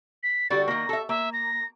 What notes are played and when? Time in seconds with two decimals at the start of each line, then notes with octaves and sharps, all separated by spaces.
0.23 B6
0.50 D3 G3 F#4 A6
0.68 D#3 A#3 A#6
0.89 A4 E5
1.09 A#3 E5
1.33 A#6